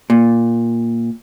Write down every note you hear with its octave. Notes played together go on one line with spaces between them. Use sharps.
A#2